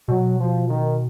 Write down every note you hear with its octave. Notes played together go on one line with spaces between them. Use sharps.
B2 F#3
F3
D#3